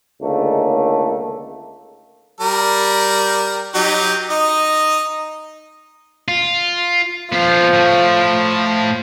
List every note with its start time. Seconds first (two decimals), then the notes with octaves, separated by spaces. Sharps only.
0.22 C#2 D3 D#3 A3 A#3
2.40 G3 A#4
3.75 F#3 D#4 G4
4.30 D#4 D#5
6.28 F4
7.32 F3 B3 F5
7.73 A2 A3